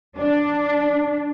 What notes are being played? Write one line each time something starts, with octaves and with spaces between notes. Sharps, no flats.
D4